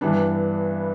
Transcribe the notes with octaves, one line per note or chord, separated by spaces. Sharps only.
G2 E3 G3 B3 D4